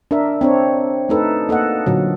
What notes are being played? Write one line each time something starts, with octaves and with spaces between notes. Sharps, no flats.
D4 A#4 E5
C4 D4 C#5
A3 D#4 A4 B4
A#3 A4 D#5 F#5
A#2 D3 F#3